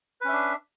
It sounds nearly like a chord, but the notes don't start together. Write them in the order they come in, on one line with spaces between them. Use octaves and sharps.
B4 C#4 E5 D4